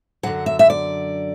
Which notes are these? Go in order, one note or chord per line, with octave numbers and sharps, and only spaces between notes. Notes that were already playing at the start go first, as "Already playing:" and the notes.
F#2 D3 F#3 F#5
E5
E5
D5